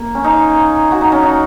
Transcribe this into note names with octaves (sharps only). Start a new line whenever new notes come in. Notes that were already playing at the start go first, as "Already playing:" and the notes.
Already playing: A#3
C#4
D#4
F#4
D#4
C#4
D#4